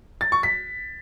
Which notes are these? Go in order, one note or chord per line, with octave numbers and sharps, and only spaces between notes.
A6
C#6
B6